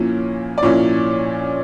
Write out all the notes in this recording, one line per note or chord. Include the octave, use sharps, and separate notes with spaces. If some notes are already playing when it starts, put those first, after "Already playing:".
Already playing: A#2 F3 A#3 C#4 E4
D5
A#2 F3 A#3 C#4 E4 C#5